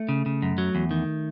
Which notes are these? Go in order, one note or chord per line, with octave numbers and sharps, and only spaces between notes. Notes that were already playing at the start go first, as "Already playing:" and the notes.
Already playing: A3
C#3
C#3
F#2
F#3
E2
D#3